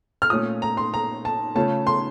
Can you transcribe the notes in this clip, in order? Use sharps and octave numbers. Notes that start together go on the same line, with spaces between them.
F6
A#2 A3 C#4 F4 D#6
A#5
C6
A#5
A5
C#3 A3 C#4 F4 A5
C6